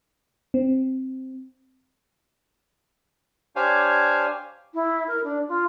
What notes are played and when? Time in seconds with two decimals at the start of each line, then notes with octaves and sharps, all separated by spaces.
0.54 C4
3.56 D4 G4 C5 C#5 F5 G#5
4.74 E4
5.08 A#4
5.24 D4
5.49 F4